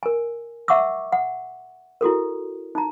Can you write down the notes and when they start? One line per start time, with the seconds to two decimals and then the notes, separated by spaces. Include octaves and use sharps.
0.03 A#4 G#5
0.68 E5 F#5 C#6 D6 E6
1.12 F#5
2.01 E4 F#4 A4 A#4
2.75 D#4 A#5